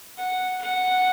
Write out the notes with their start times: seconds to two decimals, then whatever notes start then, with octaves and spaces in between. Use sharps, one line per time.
0.18 F#5
0.61 F#5